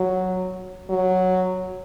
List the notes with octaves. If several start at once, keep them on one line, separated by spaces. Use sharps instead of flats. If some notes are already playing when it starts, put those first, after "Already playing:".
Already playing: F#3
F#3